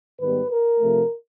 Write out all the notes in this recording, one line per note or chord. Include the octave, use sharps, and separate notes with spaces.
G#2 D#3 G3 B3 B4
A#4
C3 F3 A3